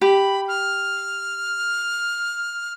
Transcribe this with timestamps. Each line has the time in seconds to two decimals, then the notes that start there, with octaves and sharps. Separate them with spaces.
0.01 G4 B5
0.48 F6